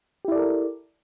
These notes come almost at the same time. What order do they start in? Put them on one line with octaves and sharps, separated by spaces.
G4 E4 D5 A4 A#4